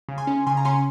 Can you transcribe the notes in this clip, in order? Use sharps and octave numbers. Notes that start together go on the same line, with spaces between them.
C#3
G#5 C6
C#4
C#3 G#5 C6
A#5
C#4 G#5 C6